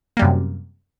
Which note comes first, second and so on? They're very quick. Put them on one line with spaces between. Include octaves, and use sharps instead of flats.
A#3 G3 F#2 C3